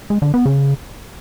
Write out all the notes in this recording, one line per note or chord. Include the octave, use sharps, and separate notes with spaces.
G#3
D3
B3
C#3